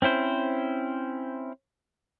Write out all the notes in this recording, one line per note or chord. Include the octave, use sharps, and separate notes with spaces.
C4 C#4 E4 C5